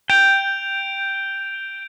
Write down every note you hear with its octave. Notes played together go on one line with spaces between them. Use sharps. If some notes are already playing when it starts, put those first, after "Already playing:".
G5 G6 D7 F7